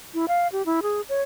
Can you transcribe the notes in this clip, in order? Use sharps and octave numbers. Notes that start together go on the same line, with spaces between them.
E4
F5
G4
E4
G#4
C#5